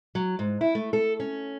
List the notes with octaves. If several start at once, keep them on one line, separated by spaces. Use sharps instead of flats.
F#3
G#2
E4
A3
A4
C#4